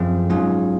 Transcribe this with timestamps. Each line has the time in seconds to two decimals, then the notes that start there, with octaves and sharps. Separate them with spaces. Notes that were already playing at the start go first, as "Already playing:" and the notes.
Already playing: F#2 F3 C4 F4 G#4
0.29 G#2 F#3 C#4 F4 G#4